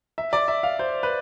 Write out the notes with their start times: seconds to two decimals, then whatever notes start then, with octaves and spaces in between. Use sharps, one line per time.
0.18 E5
0.33 D5
0.48 E5
0.63 F5
0.79 C5
1.03 B4